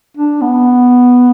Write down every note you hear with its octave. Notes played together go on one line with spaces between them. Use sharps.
D4
B3